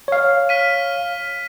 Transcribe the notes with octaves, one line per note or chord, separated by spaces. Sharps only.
C#5 F5
F6 B6 D#7